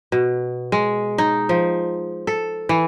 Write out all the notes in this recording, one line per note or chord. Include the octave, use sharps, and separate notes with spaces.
B2
G#3
D#4
F3
A4
E3